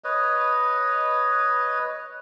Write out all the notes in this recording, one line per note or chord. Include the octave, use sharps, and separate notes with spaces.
B4 C#5 D#5